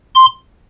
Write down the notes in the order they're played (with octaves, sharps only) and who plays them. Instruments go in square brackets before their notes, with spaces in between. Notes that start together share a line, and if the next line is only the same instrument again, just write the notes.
[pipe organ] C6